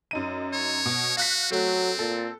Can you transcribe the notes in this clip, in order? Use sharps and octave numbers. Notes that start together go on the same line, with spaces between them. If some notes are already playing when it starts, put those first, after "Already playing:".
F#2 D#4 D#7
C#5
B2
F#4 F5 F#6 B6
F#3 A3 C4
A#2 A4